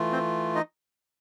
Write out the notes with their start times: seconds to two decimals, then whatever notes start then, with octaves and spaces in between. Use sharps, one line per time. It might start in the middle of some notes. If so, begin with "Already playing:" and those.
Already playing: E3 A3 F4
0.12 C4 C5
0.55 D#4 D#5